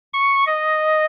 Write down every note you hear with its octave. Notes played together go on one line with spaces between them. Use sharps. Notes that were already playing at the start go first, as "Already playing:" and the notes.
C#6
D#5